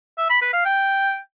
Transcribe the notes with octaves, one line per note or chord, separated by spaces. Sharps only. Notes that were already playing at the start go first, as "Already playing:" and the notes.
E5
B5
B4
F5
G5